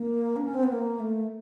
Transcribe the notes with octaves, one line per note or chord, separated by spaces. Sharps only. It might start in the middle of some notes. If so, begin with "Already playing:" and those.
Already playing: A#3
D4
C#4
C4
B3
A#3
A3